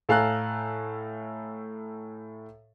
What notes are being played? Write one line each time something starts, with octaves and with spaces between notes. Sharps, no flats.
A2 A4 F5 G#5 A#5 F#6